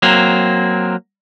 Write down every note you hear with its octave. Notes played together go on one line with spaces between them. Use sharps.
F#3 A#3 C4